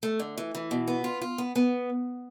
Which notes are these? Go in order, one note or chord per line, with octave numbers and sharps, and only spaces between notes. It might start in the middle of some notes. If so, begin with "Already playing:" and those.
A3
D3
E3
E3
B2
B3
F4
F4
B3
B3